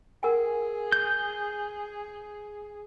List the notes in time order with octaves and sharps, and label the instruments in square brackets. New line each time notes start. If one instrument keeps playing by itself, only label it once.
[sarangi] G#4 [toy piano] A#4 F#5 G#5
[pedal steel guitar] G6